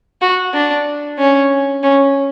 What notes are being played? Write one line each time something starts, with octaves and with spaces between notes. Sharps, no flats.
F#4
D4
C#4
C#4